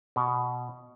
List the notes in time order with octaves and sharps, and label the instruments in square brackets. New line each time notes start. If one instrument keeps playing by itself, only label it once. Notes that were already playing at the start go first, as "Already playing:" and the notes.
[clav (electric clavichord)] B2